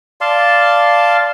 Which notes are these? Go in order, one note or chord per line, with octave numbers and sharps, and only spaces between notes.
D5 F5 A5 C6